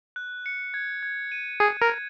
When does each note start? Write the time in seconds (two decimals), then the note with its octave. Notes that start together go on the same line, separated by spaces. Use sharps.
0.16 F#6
0.46 C#7
0.74 G#6
1.03 G#6
1.32 D#7
1.60 G#4 G#6
1.82 A#4
1.89 G#6